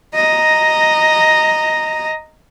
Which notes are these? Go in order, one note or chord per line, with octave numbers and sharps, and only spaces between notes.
D#5 A#5